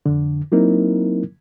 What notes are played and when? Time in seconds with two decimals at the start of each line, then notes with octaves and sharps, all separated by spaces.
0.06 F2 D3
0.52 F#3 A#3 C4 D#4 E4 A#4